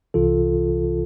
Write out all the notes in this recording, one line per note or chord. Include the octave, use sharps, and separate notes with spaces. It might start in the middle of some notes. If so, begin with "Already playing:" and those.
C2 C3 E3 F4 A4